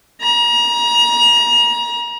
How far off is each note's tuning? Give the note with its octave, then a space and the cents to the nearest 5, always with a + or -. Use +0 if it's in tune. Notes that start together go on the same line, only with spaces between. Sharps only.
A#5 +35